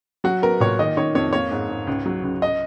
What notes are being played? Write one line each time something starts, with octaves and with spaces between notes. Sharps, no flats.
F#3 F#4
B3 A#4
A#2 C#5
D#3 D#5
D#3 C#5
F2 C#5
A#3 C#5
G#2
G#2
C#2
F#3
C#2
D#5